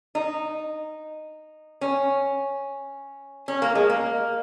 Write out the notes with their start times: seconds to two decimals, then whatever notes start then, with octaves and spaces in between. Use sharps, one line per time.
0.15 D#4
1.81 C#4
3.48 C#4
3.62 A#3
3.75 G#3
3.90 A#3